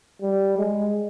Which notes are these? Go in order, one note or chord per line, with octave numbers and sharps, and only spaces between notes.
G3
G#3